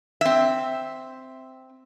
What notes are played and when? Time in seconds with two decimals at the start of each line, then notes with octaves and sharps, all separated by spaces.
0.21 C4 E5